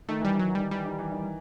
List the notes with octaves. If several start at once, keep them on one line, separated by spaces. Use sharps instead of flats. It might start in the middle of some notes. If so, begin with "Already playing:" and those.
D#3 A3
E3 G3
D#3
F#3
E3
D#3 G3
E3 G3
D#3
E3
D#3